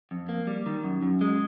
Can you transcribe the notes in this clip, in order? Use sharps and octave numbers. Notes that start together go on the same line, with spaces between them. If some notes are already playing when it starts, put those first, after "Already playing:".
F2
A#3
G3
D#3
F#2
F#2
G#3